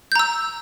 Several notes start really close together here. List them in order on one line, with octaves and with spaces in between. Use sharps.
G6 A#5 E6